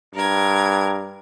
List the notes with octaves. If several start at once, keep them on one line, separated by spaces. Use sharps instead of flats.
G2 A#4 G#6